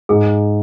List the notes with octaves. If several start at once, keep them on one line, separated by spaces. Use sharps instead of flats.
G#2 G#4